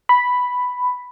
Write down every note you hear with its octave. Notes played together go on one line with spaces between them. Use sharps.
B5